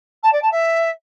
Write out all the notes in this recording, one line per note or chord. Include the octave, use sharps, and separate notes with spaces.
A5
D5
A5
E5